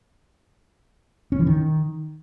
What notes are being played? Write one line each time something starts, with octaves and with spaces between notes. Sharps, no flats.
C#4
E3
D#3